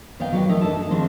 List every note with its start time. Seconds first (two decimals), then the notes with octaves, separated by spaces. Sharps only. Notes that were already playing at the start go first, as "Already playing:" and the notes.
0.20 D#3 B3 D5 F5 G5
0.32 D#3 F#3 F#4 B4 D5
0.49 E3 A3 D#4 A#4
0.61 D4 A4 D#5 A5
0.76 D#4
0.90 D#3 F3 G#3 C4 D4